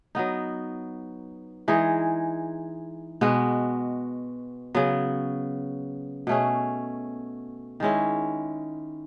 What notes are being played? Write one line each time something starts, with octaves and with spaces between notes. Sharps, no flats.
F#3 B3 D#4
E3 G#3 D#4 G#4
B2 G#3 B3 F#4
C#3 F#3 B3
B2 A3 C#4 G#4
D#3 G#3 C#4 E4